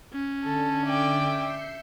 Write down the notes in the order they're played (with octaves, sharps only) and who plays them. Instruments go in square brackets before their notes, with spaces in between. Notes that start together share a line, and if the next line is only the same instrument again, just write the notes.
[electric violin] C#4
[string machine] D3 [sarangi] A4
[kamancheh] D5 G5 [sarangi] E5
[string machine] G6 C7 C#7